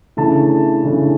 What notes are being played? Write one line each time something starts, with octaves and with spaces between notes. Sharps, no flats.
C#3 E3 A3 D4 A5
C#3 E3 A3 D4